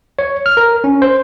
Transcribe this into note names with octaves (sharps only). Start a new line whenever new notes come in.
C#5
F6
A#4
C#4
C5